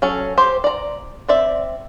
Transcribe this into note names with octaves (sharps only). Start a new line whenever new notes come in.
F#3 C#4 A4
G4 C5
D5 A#5
C4 D5 E5